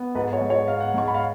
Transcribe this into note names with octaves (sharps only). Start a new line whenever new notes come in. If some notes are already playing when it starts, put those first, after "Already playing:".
Already playing: B3
G#2 B4
C#5
G#2
C#5
G#2 F5
F#5
G#2 C#6
B5
F5